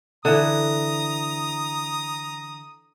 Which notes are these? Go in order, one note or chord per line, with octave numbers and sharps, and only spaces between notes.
D3 E3 A#5 D#6